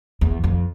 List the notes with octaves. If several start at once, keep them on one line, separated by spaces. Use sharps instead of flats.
E2
F2